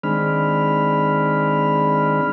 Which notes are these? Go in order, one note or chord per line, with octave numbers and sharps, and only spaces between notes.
D#3 G#3 C4 D4 B5 F6